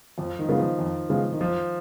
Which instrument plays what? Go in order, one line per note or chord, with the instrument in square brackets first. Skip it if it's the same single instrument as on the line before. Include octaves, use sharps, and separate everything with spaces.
[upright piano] F2 [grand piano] F3
[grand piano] D#3
[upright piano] C#3 G#3 B3 F4
[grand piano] F3
[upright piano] F2
C#3 G#3 B3 F4
[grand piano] D#3
[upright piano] F2 [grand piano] F3